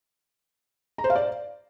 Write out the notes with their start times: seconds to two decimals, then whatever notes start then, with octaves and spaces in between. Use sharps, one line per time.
0.98 A#5
1.04 C5
1.10 F5
1.16 D5